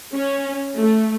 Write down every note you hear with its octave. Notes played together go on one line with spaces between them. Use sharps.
C#4
A3